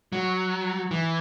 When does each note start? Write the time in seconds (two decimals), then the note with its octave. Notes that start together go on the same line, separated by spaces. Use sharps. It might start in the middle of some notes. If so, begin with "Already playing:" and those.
0.12 F#3
0.91 E3